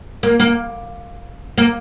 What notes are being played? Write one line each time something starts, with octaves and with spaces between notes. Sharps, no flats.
A#3
A#3
A#3